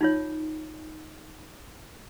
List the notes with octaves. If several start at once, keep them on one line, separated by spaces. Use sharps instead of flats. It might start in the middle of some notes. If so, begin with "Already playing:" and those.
D#4 F4 C#5